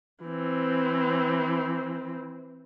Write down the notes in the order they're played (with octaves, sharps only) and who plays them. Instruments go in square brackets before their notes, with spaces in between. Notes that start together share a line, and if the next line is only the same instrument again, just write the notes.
[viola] E3 C4